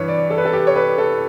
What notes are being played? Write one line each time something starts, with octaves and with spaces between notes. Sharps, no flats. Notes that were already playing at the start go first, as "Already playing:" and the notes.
Already playing: G2 E3 B4 C#5
D5
A4
B4
A4
G4
C#5
B4
A4